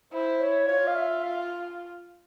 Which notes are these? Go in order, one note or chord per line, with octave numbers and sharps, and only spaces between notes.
E4 C5
C#5
F4 C#5
F5
E5
F5